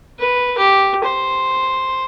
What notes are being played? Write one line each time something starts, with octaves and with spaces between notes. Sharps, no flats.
B4
G4
C5